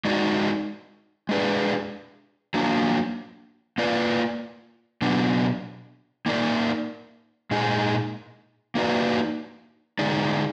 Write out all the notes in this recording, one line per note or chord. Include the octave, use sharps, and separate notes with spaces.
G#3 D#4 F#4 D5
G#3 D4 G#4 B4 D5
F#3 A#3 D4
A#3 F4 B4 D5
B2 F#3 B3 D4
A#3 D#4 A#4 D5
A#2 G#3 D#4 G#4
A#3 D#4 F#4 B4 D5
D3 G#3 D#4 G#4 D5